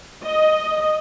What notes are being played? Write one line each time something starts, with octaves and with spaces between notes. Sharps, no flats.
D#5